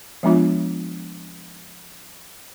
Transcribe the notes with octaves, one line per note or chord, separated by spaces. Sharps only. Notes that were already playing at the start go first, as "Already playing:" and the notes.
F3 G#3 B3 D4 F4 E5